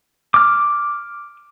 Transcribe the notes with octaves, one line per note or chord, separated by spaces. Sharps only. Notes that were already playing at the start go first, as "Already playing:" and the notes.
D6 F6